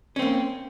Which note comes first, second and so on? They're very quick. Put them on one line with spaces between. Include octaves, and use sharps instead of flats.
C#4 C4 A#3